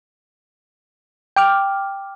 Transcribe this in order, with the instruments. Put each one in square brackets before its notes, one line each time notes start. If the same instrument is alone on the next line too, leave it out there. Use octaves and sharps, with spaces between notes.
[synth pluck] G5 D6 F6